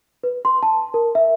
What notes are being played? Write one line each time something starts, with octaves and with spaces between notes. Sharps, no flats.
B4
C6
A5
A#4
E5